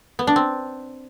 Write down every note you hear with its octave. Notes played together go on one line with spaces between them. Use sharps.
B3
D4
C4